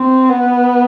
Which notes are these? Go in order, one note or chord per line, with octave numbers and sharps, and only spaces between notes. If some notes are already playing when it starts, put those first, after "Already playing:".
Already playing: C4
B3